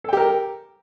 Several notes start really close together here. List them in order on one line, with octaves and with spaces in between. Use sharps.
A4 G5 G4 A#4